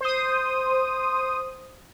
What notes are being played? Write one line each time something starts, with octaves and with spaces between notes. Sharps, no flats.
C5 D#6